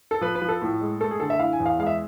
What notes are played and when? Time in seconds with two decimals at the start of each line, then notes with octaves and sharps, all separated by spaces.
0.11 A4
0.21 F3 B4
0.35 B4
0.42 F3
0.49 A4
0.62 A2
0.81 G#3
1.01 A3 A4
1.11 G#4
1.20 D3 A4
1.30 E5
1.40 E4 F5
1.53 G#5
1.60 E2
1.66 F5
1.79 G#3 F5
1.87 E5